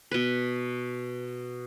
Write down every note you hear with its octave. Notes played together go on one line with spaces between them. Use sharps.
B2 B4